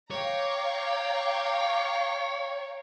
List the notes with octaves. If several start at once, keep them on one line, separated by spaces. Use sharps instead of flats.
C#5 F5 G5 A#5 D6